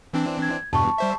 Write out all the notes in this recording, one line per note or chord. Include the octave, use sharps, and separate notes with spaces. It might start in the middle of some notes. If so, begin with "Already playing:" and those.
E3 C4 D4
G#6
E2 G2 B2 A5 C#6
G3 C5 E5